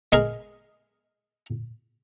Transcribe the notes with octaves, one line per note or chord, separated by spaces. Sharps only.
G#3 G#4 A#4